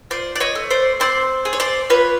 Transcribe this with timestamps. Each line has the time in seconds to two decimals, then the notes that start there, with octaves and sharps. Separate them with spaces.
0.11 F4 C5 D5
0.36 D5
0.40 C#5 D#5
0.55 A3
0.70 C5 D5
1.00 C4 C5 D5
1.45 G#4
1.53 C#5
1.60 C5 D5
1.90 F4 B4 C#5